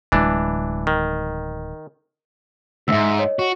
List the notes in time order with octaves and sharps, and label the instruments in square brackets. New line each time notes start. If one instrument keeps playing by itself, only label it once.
[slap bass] D1 G#3 [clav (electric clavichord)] E3 D4
[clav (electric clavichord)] D#3
[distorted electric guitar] D2 G#2 [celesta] E5 E6
[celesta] C#5 D#5
[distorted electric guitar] F#4